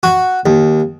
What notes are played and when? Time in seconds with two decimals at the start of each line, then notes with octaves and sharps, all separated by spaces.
0.03 F#4
0.46 D#2